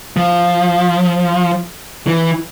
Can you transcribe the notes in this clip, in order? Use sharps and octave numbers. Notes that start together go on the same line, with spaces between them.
F3
E3